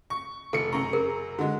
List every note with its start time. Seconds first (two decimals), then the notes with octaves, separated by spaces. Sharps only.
0.10 C#6
0.53 F1 A4 C#7
0.73 F#2 C#3 A#5 C#6
0.93 G#4 A#4
1.39 D3 G#3 F#4